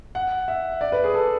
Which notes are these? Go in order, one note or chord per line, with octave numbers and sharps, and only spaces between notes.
F#5
E5
D5
B4
G#4
A4